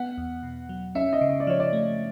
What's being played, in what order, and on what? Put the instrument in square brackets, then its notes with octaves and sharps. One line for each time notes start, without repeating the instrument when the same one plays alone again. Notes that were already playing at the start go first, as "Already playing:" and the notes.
Already playing: [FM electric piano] B3 [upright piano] F#5
[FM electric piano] E2
B2
F#3
[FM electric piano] C#4 [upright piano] E5
[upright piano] D#5
[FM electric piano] C#3
[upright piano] D#5
D5
[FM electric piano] F3 [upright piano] C#5
[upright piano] D5
[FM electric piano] A3